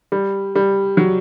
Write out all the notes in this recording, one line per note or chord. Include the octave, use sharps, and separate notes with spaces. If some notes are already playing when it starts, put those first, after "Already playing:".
G3
G3
F#3